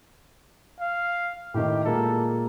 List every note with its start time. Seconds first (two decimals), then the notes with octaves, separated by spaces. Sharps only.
0.80 F5
1.54 A2 D#3 G4
1.84 A#2 G#3 A#3 A4